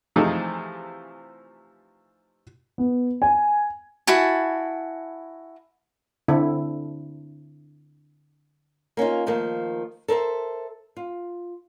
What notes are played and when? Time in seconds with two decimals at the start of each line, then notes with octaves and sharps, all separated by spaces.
0.16 C3 E3 F3 A3 D#4 G#4
2.78 B3
3.22 G#5
4.07 E4 F#4 G#5 A5
6.28 D3 C4 E4 A4
8.97 A#3 C#4 D#4 F4
9.27 D#3 F3 A3 A#3
10.08 A4 A#4 C5 E5
10.97 F4